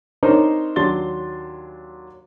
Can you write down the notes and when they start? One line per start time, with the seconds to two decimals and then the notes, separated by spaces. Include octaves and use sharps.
0.23 C4 D4 D#4 A#4 C5 C#5
0.76 D#2 F#3 D4 C6 A6 G7